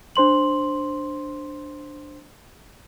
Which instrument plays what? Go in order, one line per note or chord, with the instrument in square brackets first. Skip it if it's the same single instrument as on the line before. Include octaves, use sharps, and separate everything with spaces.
[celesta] D4 C5 C6 F#7